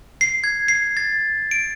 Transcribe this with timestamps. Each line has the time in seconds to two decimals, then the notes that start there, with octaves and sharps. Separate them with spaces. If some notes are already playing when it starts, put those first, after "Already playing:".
0.21 C7
0.44 G#6
0.68 C7
0.97 A6
1.51 D7